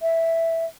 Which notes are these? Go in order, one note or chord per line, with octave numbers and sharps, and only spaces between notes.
E5